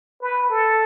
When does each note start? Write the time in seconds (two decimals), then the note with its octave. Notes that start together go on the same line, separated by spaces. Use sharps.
0.21 B4
0.50 A4